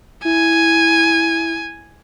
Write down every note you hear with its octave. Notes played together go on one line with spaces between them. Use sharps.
E4 G#5